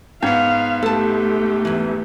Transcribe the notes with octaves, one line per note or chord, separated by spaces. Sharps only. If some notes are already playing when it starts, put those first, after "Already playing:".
G#2 B3 C#5 F5
A3 G4 A4 A5
E2 E3